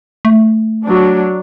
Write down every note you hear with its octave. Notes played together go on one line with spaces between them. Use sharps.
A3
F#3 D4